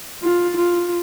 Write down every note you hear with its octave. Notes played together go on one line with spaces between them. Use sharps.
F4
F4